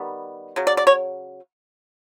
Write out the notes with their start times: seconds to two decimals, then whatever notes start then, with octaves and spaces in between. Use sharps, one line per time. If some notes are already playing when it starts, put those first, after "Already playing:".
Already playing: D#3 G3 B3
0.56 C#3 F#3
0.67 D5
0.77 D5
0.87 C#5